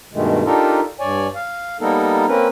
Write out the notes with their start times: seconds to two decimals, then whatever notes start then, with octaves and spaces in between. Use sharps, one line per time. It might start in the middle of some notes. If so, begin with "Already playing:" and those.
0.13 G2 B2 D#3 G#3 A3
0.45 D4 D#4 F4 G4 A4 A#4
1.00 G2 C#5 D5 G#5
1.35 F5
1.81 G3 A#3 B3 D#4 A4 A#4
2.28 A#3 C4 C#4 A#4 B4